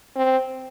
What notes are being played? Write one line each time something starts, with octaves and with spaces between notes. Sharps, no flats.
C4